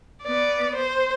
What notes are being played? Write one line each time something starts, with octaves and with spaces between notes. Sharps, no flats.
B3 D5
C5